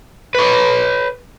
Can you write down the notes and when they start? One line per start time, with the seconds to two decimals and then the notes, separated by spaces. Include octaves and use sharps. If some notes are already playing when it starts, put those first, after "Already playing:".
0.35 B4 C#5